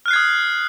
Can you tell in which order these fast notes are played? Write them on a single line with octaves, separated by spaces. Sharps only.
F6 F#6 C7 G#6 D#6